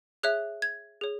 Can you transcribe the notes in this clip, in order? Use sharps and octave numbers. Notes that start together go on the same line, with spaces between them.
G#4 C#5 E5 F#6
G#6
G#4 C#5